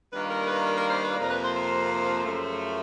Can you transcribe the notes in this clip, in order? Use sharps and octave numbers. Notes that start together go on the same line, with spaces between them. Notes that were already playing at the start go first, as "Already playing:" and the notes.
D#3 G3 A#3 D4 F4 B4
A#4
B4
A#4
A#4
C5
B4
F2 C3 F3 A#3
A#4
B4
C5
C5
F#2 C#3 F3 A3